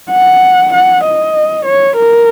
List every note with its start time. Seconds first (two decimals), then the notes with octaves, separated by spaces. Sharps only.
0.11 F#5
0.73 F#5
1.04 D#5
1.66 C#5
1.96 A#4